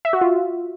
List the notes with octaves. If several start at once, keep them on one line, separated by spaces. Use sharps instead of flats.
E5
F#4
F4